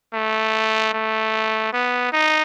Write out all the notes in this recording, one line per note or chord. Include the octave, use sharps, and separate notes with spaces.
A3
A3
B3
D#4